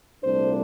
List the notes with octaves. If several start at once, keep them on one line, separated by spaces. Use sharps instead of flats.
C2 A#2 A3 D4 C5